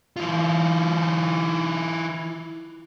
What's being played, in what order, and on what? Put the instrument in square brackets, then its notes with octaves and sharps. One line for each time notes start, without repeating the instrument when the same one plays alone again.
[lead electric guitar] E3 F4